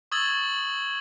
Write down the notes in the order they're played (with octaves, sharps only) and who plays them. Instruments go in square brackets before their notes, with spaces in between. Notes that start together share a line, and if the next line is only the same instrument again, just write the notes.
[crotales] C#6 D#6 E6 G#6 A6 F#7